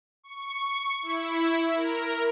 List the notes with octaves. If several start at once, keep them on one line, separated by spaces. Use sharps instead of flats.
C#6
E4
A#4